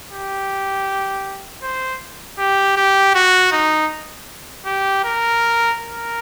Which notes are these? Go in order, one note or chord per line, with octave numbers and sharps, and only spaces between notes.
G4
C5
G4
G4
F#4
D#4
G4
A#4
A#4